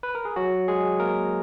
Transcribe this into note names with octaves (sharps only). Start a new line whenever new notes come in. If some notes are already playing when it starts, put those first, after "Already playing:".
B4
A#4
G#4
F#3 F#4
G#3 G#4
A#3 A#4